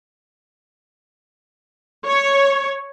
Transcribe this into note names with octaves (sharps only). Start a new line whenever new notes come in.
C#5